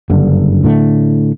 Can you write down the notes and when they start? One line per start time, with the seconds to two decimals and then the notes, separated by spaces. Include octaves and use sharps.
0.10 F#1 G2 D3
0.64 A2 D3 A3